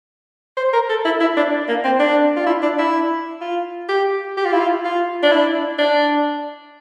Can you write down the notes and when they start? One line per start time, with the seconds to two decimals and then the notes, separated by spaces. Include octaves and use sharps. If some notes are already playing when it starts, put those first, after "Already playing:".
0.57 C5
0.73 A#4
0.89 A4
1.05 E4
1.21 E4
1.37 D4
1.68 A#3
1.84 C4
2.00 D4
2.36 F4
2.47 E4
2.62 D4
2.78 E4
3.41 F4
3.89 G4
4.37 G4
4.45 F4
4.53 E4
4.60 F4
4.85 F4
5.23 D4
5.32 E4
5.79 D4